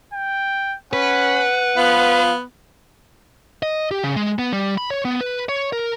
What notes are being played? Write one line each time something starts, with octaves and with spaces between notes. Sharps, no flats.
G5
C#4 B4 F#5
F3 B3 F5
D#5
G4
C#3
G#3
B3
G3
B5
C#5
B3
B4
C#5
A#4